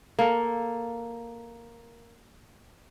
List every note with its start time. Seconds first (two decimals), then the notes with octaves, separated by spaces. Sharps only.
0.19 A#3 A4